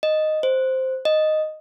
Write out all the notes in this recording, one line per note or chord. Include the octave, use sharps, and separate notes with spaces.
D#5
C5
D#5